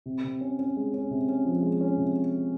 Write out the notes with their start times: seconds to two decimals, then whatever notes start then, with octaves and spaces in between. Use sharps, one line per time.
0.06 C3
0.24 C3
0.41 C#4
0.59 C#4
0.76 G#3
0.94 C#4
1.11 C3
1.28 C#4
1.45 F3
1.62 G#3
1.81 C#4
1.98 C3